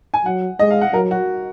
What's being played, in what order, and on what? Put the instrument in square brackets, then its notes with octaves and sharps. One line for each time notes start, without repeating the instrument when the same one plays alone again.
[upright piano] G#5
[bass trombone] F#3 [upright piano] F#5
[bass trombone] G#3 [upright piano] D#5
[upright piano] F5
F#5
[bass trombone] F#3 [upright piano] A#4
[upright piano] F#4